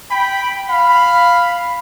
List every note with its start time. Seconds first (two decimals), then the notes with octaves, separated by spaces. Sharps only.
0.10 G5 B5
0.69 F5 B5